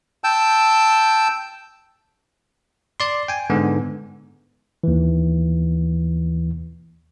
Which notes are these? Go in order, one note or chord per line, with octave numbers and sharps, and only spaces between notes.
G5 A5 E6 G6
D5 C6
G5 G#5
G#2 D3 B3
D#2 E3